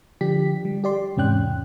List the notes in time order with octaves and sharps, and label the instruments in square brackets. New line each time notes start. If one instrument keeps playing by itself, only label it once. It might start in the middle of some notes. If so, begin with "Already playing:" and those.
[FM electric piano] D3 F3 D4 G4 B6
G3
G4 D5 C6
E2 G#2 C3 C#4 G5 F#6